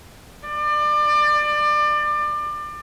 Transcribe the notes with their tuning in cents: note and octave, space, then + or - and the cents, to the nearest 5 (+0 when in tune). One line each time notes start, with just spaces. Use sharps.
D5 +30